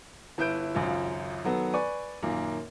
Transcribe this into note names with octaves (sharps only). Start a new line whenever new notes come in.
G1 E4 B4 G6 D7
G#1 C#2 F#2 F4
D#3 F#3 B3 A4
B4 D5 G#5 C#6
F#2 A#2 D#3 A#3